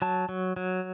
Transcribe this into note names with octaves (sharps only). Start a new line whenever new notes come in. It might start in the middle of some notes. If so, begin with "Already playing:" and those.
F#3 A5
F#3
F#3